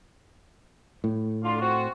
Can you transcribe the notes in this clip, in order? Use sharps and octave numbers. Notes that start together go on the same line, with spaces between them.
A2
D3 F4
C4 F4 F#4